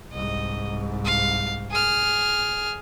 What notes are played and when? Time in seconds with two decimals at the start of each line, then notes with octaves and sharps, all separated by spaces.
0.13 C2 G#2 D#5
1.05 F5
1.71 G#4 F6